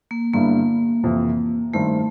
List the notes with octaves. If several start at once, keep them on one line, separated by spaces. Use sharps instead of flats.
A#3
G2 D3 G3 A#3 B3 E4
F2 C3 E3
G2 D#3 G3 A3 C4 E4